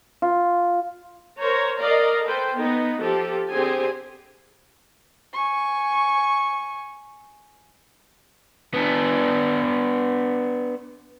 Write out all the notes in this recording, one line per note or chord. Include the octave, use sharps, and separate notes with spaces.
F4
A#4 C5 C#5 A#5
A#4 D5 D#5 F5 A#5
A4 B4 C5 G5
B3 D#4 B4
F3 G4 A4
D3 C4 G4 G#4 C5 G#5
G#5 C#6
B3 D4